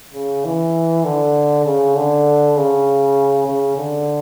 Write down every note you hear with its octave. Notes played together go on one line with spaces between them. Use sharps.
C#3
E3
D3
C#3
D3
C#3
C#3
D3